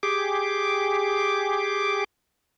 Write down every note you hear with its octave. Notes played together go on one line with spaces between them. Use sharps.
G4 G#4 D6